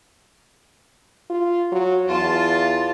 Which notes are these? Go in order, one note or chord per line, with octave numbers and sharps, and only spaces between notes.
F4
F#3
E2 F4 A5